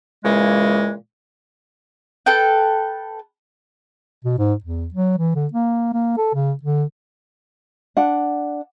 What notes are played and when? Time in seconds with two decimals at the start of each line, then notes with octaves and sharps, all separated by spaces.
0.24 A#2 C#3 E3 G#3
2.26 A4 B4 G5
4.25 B2
4.38 G#2
4.64 E2
4.94 F#3
5.18 E3
5.35 D3
5.53 A#3
5.93 A#3
6.17 A4
6.34 C#3
6.63 D3
7.97 D4 F#5